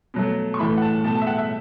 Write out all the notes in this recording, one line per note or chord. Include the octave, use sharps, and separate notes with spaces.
B2 F#3 A3
C#6
A2 E3 A3 B5
F#5
A5
B2 A3 A5
A5
E5
F#5
E5